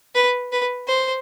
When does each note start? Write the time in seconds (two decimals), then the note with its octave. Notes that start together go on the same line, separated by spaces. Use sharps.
0.15 B4
0.52 B4
0.88 C5